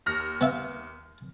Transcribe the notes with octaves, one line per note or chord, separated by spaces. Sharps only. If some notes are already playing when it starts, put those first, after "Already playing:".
D#2 F6 A#6
B3 E5 F5